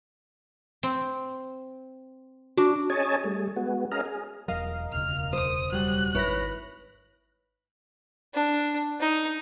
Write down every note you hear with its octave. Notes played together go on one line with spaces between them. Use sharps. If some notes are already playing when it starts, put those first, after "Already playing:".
C4
D4 F#4
C#4 G#4 C#5 D#5 G#5 A5
G3 A3 G#4
G#3 B3 F#4
C#4 G#4 A#4 D#5 F5 A#5
G#4
E1 F#3 A#4 D#5 F5
E1 D2 C#3 F6
C5 D#6
F#3 G3 F#6
G#1 E4 B4 C#5 B5 A#6
D4
D#4